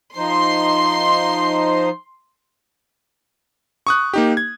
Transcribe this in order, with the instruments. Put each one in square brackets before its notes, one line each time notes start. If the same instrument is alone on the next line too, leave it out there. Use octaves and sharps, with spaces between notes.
[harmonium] F3 D#4 C5 [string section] C6
[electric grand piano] C#6 D#6 F#6
A#3 D#4 G4
G#6